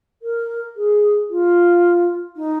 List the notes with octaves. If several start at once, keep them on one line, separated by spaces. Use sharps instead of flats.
A#4
G#4
F4
D#4